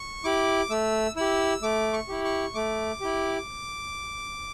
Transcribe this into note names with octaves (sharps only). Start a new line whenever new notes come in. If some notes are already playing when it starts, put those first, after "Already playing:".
Already playing: C#6
E4 G4 D6
A3 E6
E4 G4 E6
A3 D6
C#6
E4 G4
C#6
A3 D6
E4 G4